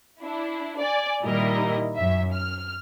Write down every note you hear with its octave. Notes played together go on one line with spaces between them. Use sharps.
D4 E4
D5 G#5
A#2 D#3 G3 E4 A#4 D#5
F#2 E5
F6